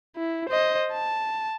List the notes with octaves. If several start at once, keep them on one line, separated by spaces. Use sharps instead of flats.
E4
C5 D#5
A5